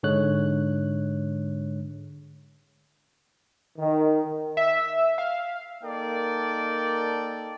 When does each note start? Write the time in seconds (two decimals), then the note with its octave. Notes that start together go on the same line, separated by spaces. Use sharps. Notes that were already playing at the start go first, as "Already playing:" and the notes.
0.03 G#2 D3 G#3 C#5 F#6
3.78 D#3
4.57 E5
5.18 F5
5.83 A#3 D#4 A4 A#4 D5 G5